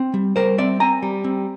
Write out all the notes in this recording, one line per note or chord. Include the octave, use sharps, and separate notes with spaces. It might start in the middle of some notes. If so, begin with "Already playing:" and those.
Already playing: C4
G3
G3 A#4 C5
C4 D5 E5
C4 G#5 A#5
G3
C4